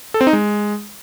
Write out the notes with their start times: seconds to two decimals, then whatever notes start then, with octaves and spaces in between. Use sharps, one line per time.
0.14 A4
0.21 C4
0.27 D#4
0.33 G#3